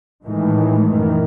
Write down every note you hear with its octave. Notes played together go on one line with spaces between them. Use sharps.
A2 D#3 E3 G#3 A3
F#2 A#2 D#3 E3